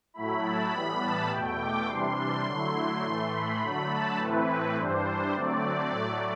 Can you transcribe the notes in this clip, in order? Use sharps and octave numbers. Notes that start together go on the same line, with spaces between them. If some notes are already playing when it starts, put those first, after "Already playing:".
A2 F#3 A3 E4 B5
A5
A2 E3 G3 B3 B5
A5
E2 B2 A3 G5
D6
C3 E3 G3 D4 C6
D3 F#3 A3 E4 C6
A2 E3 A3
B5
D3 F#3 A3 B5
A5
A2 E3 A3 C4 E4 B4
B4
G2 E3 G3 D4 C5
D3 F#3 A3 C4 D5
A2 F#3 A3